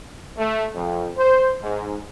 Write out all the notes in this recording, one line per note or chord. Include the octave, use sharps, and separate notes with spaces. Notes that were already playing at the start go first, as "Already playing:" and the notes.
A3
F2
C5
G#2